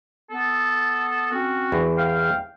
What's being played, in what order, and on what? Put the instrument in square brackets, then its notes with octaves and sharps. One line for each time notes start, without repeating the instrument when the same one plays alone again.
[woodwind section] B3 A4
C4 C#4 F#4
[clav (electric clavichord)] E2
[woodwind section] F5 G5